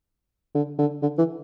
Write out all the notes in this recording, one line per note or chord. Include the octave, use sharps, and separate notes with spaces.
D3
D3
D3
E3